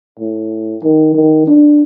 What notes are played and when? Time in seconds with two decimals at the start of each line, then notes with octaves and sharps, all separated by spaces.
0.20 A2
0.83 D#3
1.15 D#3
1.47 D4